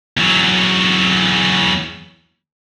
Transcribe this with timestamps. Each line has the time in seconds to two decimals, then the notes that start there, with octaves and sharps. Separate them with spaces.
0.17 E2 F#3